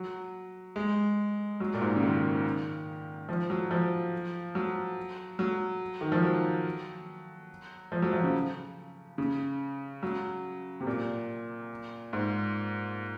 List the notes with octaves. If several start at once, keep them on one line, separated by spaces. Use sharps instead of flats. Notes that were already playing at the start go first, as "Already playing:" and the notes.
Already playing: F#3
G#3
F#3
A#2
G#2
C#3
D#3
F3
F#3
F3
F#3
F#3
D#3
F3
F#3
F3
F#3
F3
C#3
C#3
F#3
C3
A#2
G#2